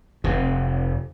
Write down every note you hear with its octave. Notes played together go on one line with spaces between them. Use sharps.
F1 C3